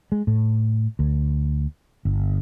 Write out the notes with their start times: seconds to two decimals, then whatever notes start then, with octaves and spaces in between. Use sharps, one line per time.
0.12 G#3
0.27 A2
0.99 D2
2.05 G1